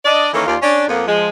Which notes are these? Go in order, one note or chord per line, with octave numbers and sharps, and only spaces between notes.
D4 D5 D#5
D#3 E3 A#3 C#4 A4 A#4
D#2 F4 D5
C#4 D4
F2 A#3 B3
F3 G#3